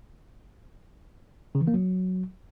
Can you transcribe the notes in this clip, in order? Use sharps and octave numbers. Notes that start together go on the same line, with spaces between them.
C#3
E3
A#3
F#3